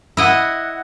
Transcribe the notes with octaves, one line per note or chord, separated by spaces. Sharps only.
E4 D#5 F#5